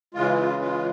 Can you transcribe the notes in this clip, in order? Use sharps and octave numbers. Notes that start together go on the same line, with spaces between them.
C#3 E3 G#3 F4
E4
F4
F4